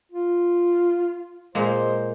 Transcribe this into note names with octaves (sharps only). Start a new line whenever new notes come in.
F4
A#2 G#3 A#3 C5